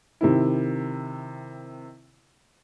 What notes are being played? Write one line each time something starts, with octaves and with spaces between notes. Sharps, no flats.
C3 D#3 E4